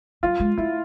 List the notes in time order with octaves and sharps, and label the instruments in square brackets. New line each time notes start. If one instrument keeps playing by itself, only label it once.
[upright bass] F#3 [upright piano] F4
[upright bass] G#3
[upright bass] A3 [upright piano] E4